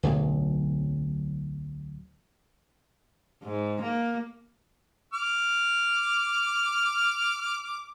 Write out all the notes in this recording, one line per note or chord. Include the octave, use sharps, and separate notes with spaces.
D1 B1
G#2
A#3
D6 F6